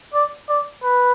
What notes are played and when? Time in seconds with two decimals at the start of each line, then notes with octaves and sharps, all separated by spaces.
0.14 D5
0.49 D5
0.84 B4